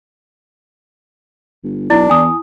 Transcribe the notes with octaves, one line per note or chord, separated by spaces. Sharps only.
G1
B1 D4 E4
E2 G#5 D#6